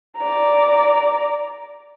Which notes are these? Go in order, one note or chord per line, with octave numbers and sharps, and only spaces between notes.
D5 A#5